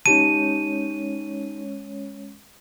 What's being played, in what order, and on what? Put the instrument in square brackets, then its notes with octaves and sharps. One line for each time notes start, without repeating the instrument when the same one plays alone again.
[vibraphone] G#3 C#4 C#5 [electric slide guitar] D#4 G4 A5 [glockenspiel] D#7